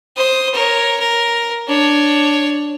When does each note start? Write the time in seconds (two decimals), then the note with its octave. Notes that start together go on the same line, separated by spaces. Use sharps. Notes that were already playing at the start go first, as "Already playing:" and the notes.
0.17 C5 D#6
0.54 A#4 C#5
1.00 A#4
1.68 D4 C#5